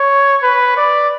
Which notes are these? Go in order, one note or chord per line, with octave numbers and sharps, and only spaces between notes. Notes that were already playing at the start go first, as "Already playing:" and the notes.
Already playing: C#5
B4
D5